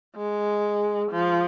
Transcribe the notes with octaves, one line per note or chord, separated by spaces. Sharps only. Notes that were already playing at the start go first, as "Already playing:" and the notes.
G#3
F3